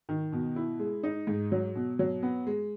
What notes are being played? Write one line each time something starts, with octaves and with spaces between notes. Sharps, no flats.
D#3
B2
E4
G#3
D#4
G#2
F#3
B2
F#3
B3
G#3